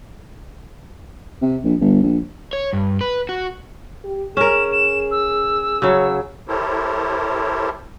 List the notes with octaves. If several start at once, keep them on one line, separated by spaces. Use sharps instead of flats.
C3
A#1
G1
A#1
C#5
G2
B4
F#4
G4
C#4 G#4 A#4 E7
E7
E6
C#3 F#3 C#5
E4 G4 A4 A#4 C5 C#5